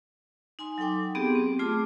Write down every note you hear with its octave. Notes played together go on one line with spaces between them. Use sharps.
D#4 G#5 C6
F#3 D#4 A4 G5 D6
B3 C4 G4 G#4
C4
A3 F4 G#4 A5 D6